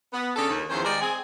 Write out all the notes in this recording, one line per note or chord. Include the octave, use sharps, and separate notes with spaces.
B3
C#3 C#4 D4 A4
D#2
E2 D#3 F3 C#4 C5
D#3 G3 G#3 G#4 A#4 D5
C4 G#4